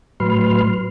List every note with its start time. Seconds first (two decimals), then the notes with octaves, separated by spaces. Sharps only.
0.20 A2 F#3 B4 C6 F6